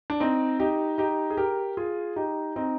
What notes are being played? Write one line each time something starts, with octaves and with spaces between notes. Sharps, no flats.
D4
C4 D#4
D#4 G4
D#4 G4
G#4
G4 A#4
F4 G#4
D#4 G4
C4 D#4